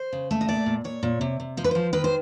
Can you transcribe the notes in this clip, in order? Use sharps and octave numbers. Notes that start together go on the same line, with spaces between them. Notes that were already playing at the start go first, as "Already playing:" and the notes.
Already playing: C5
C#3
A3
D#5
A#2 D5
A#2
A#2 C#5
A#2
C3
C3
F3 C5
B4
F3 C5
D#3 B4
C5